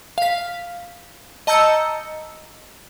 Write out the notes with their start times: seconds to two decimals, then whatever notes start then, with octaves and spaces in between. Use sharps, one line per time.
0.18 F5 B6
1.47 D#5 A5 A#5 E6 G6 C#7